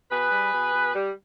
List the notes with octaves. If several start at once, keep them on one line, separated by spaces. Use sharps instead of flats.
B2 G#4 B4
G3
B2
B2
G3